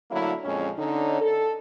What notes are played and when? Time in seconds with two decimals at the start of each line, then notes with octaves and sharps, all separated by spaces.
0.10 D3 F#3 A3 A#3 E4
0.43 F2 A#2 G#3 C#4
0.77 D3 C#4 D#4
1.20 A4